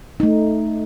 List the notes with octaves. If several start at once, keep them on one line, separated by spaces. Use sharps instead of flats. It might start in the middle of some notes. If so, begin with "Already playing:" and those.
A3 D#4